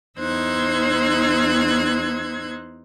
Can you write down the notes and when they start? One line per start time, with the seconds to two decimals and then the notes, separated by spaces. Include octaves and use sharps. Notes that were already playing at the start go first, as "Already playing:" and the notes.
0.19 E2 D#4 C5 E6 F#6 G#6